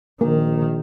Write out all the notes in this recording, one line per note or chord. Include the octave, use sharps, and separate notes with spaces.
A#1 D#3 A#3